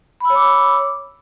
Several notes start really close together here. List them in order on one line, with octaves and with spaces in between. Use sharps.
B5 E6 C#5 D6